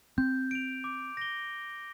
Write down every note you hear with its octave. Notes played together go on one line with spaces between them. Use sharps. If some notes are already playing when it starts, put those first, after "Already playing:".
C4 G6
D7 F7
D6
A#6 G7